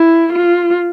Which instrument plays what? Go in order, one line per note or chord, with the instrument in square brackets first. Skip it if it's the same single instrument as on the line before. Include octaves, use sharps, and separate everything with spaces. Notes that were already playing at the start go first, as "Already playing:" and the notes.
Already playing: [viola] E4
F4